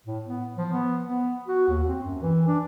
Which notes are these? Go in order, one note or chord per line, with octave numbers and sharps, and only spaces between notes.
A2
B3
F3
B3
B3
F#4
D#2
C4
F#2
E3
D4